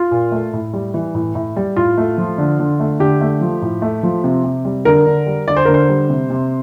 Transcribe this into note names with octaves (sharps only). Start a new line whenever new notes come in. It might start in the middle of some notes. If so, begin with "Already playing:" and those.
Already playing: F4
A#2
A3
A2
G3
E3
A2
A2
G3
A2 F4
A3
F3
D3
D3
A3
D3 G4
A3
F3
A2
A3
F3
C3
C3
G3
D3 A#4
D3
G3
D3 D5
C5
D3 A#4
C5
G3
C3
C3